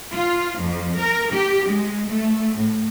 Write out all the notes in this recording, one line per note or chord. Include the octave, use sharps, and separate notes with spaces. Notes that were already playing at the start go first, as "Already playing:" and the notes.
F4
F2
A#4
G4
G#3
A3
A2